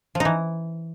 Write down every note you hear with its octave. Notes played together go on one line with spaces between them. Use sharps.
F3
D#4
E3